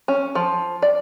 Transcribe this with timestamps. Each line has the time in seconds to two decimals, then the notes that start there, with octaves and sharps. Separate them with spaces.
0.08 C#4
0.35 F3
0.82 D5